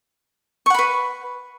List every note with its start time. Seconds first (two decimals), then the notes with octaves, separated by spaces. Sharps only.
0.66 C#6
0.70 F#5
0.74 B5
0.79 B4